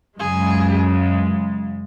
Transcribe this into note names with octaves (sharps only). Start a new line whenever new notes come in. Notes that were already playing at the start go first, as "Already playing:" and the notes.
F#2 C#3 G#3 G#4